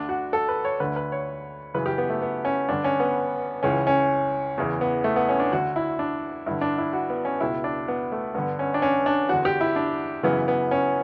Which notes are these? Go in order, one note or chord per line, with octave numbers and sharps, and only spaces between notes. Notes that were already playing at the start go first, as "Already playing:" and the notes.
Already playing: D2 D3 D4
F#4
A4
B4
C#5
D2 D3 B4
B4
C#5
F#2 C#3 E3 B4
G4
B3
A3
B3
C#4
G2 D3 D4
C#4
B3
C#2 C#3 E3 C#4
C#4
E2 C#3 E3
B3
A3
B3
C#4
D4
D2 D3 F#4
E4
D4
G2 D3 E4
D4
E4
F#4
B3
C#4
C#2 B2 E4
D4
B3
A3
G2 D3 B3
C#4
D4
C#4
D4
E2 D3 F#4
G4
E4
D4
F#2 C#3 E3 B3
B3
C#4